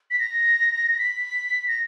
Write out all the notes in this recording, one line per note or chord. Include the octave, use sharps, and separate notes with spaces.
B6
A#6
B6
A#6